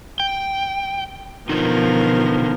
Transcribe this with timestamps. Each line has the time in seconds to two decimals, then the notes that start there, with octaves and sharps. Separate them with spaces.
0.20 G5
1.49 B2 D3 F3 D#4 A#4